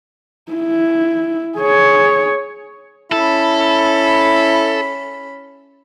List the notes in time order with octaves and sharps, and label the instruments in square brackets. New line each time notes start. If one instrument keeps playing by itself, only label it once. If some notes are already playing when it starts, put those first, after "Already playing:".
[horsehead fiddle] E4
G#4 C#5
[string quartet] C#4 B5 [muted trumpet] E4 [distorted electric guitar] A4